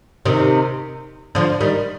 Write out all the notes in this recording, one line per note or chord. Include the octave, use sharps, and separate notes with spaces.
C3 D#3
D3 F3
D#3 G3